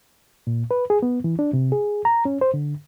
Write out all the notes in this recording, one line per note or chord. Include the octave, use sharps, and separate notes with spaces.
A#2
B4
G#4
B3
E3
D4
C3
G#4
A#5
C#4
C5
D3